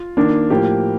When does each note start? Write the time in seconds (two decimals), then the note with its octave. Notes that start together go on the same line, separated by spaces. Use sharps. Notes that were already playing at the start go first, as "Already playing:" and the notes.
Already playing: F4
0.17 D#3 A#3 D4
0.50 A2 F3 A#3 G4